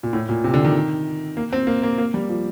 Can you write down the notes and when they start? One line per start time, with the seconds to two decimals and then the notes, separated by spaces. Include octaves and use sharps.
0.03 A#2
0.13 A2
0.29 A#2
0.44 C3
0.54 D3
0.64 D#3
1.37 A#3
1.53 C4
1.67 A#3
1.83 A#3
1.98 A#3
2.14 G3
2.29 F3